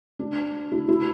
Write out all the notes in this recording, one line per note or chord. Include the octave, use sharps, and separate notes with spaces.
D4
E4
E4